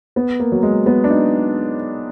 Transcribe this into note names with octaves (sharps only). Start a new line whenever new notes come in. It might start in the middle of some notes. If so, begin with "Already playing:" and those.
B3
A#3
F#3
G#3
B3
D4
D#4